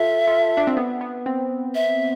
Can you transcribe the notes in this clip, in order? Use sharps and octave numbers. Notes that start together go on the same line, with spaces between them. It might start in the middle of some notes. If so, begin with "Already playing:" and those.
Already playing: F4 A4 E5
F4 A4
D4
C4
B3
B3
C4
E5